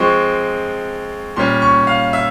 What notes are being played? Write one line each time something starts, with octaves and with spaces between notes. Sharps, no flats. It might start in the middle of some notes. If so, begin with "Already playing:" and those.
Already playing: F3 G#3 C4 C#6
A#2 G3 C#4 C6
C#6
F5
E5